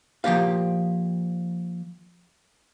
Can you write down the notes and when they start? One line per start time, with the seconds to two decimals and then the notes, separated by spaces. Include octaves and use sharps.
0.24 F3 A#3 G4 F5